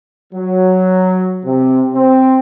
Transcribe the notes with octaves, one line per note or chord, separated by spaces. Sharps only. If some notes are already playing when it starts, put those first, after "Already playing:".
F#3
C3
C4